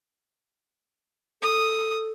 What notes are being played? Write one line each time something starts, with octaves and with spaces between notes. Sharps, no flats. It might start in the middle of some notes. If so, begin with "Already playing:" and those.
A4 D#6